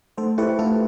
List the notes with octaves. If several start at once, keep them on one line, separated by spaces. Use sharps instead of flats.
A3 A4 C5
E4 G4 A4 B4 C5 E5
A3 F4 A4